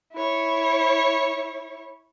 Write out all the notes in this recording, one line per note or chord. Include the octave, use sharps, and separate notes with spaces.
E4 C#5